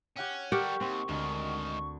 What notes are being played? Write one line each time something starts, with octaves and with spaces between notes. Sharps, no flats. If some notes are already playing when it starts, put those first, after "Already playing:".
C#4 G4 F#5 G5
G3 G4 A4 A#4 F#5 G5 C#6
D#2 C4
D2 G#2 D#3